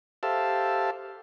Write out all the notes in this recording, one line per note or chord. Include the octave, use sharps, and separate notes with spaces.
G4 A4 C5 E5 F5 A5